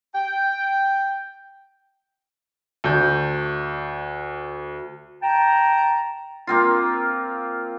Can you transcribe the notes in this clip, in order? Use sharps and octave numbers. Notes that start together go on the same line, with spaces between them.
G5
D2 G6
G5 A5 A#5
A#3 C4 F4